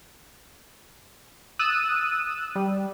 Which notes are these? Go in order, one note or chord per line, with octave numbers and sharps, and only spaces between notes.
D#6 E6 F#6 A6 D#7 E7
G3